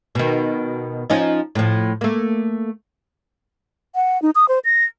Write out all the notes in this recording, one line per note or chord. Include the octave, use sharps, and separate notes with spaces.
B2 D#3
F3 C#4 D#4
A2 F3
A3 A#3
F#5
D#4
D#6
C5
A#6